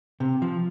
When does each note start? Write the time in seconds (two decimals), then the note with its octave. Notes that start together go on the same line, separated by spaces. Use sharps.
0.20 C3
0.42 F3